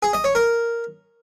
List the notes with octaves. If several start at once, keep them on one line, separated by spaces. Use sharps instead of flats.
G#4
D#5
C#5
A#4